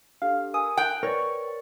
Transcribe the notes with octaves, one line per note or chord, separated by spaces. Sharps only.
D4 G4 A4 F5
A#4 G#5 D#6 E6
G5 F#6
A#4 B4 C#5 D5 C#6